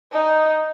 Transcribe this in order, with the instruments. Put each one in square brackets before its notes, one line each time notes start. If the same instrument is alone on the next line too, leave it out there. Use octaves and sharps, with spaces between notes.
[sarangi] D#4